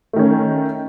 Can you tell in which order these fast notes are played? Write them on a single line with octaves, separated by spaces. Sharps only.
A3 D#3 C#4